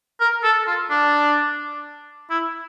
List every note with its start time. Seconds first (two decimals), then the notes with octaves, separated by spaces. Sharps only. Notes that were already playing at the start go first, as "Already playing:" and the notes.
0.21 A#4
0.44 A4
0.67 F4
0.91 D4
2.31 E4